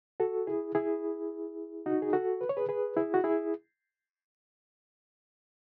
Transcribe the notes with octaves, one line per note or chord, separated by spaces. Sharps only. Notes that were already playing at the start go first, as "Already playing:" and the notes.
F#4 A4
E4 G#4
E4 G#4
D#4 F#4
G#4
F#4 A4
B4
C#5
G#4 B4
G#4 B4
E4 G#4
F#4
E4 G#4